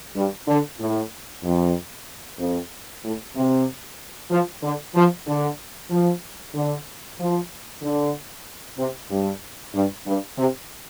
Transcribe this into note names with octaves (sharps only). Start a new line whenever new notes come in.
G2
D3
A2
F2
F2
A2
C3
F3
D3
F3
D3
F3
D3
F3
D3
C3
G2
G2
G2
C3